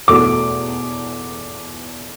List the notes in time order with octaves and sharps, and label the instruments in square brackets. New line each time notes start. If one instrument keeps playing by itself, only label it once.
[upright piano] E2 B2 A3 D6